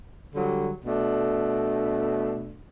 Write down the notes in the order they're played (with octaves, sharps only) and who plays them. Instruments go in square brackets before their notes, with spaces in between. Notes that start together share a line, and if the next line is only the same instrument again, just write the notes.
[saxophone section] D3 F#3 G3
B2 A3 D4